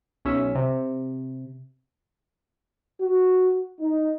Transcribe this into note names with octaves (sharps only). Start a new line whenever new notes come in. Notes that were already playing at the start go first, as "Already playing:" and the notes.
B1 C#4 E5
C3
F#4
D#4